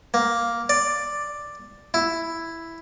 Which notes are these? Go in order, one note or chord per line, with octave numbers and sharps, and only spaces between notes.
A#3
D5
E4